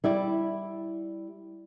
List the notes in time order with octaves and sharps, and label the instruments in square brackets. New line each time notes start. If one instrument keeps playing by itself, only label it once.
[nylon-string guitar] G3 E4 D5